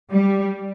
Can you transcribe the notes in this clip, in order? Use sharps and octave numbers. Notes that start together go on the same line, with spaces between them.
G3